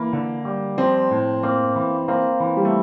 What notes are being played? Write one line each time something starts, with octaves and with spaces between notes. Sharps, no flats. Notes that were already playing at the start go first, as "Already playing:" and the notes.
Already playing: E3 A#3
D3
G3
F3 C4
A2
A#3 C4
E3
A#3 C4
E3
G3
A3